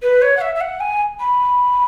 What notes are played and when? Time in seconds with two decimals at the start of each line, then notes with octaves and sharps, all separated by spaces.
0.02 B4
0.22 C#5
0.37 F#5
0.41 E5
0.55 E5
0.60 F#5
0.80 G#5
1.19 B5